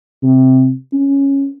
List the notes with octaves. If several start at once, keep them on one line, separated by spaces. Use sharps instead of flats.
C3
C#4